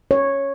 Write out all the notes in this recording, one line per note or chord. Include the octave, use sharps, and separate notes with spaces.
C#5